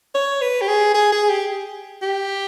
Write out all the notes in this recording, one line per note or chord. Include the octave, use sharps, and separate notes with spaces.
C#5
B4
G4
G#4
G#4
G#4
G4
G4